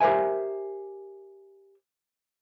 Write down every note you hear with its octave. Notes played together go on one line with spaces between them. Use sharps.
G4 A#4 C5 E5 G#5